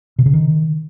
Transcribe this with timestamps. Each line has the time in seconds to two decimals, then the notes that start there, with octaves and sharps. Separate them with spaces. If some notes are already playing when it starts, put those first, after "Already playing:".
0.19 C3
0.26 C#3
0.33 D#3